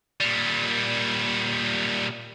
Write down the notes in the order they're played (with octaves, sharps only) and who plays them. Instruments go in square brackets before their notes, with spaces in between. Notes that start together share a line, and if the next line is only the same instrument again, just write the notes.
[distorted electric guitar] A#2 G3